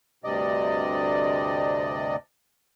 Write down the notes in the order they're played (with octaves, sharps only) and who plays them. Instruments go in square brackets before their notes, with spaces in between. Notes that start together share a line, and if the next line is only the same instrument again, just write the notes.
[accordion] D2 G2 C3 D5 D#5